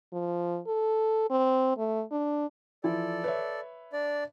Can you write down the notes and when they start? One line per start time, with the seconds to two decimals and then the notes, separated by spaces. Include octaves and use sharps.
0.13 F3
0.67 A4
1.30 C4
1.78 A3
2.12 D4
2.84 E3 F3 E4 A4 D5
3.24 B4 C#5 E5
3.93 D4 D5